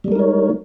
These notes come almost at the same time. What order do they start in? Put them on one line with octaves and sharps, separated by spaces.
G3 G#3 A#4 D#4 C#5